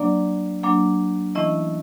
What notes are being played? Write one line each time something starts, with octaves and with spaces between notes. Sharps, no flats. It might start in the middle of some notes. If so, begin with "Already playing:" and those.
Already playing: F#3 A#3 D4 D5
F#3 A#3 D4
E3 A3 C#4 E4 D#5